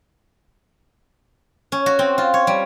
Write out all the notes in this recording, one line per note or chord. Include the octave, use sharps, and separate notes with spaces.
C#4
F#4
C4
F4
C#5
G3